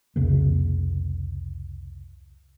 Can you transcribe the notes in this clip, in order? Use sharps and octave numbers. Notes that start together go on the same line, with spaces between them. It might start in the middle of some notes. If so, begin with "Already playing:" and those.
C2 F2 C#3 A#3